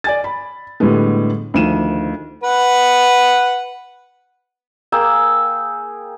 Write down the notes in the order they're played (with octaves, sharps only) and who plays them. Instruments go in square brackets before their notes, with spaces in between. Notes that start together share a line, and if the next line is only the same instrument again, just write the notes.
[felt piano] D5 G#5 A6
B5
A2 D3 G3 G#3 B3
D2 D#3 F3 D#7 E7
[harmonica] B4 F#5
[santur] A#3 G#4 G5 E6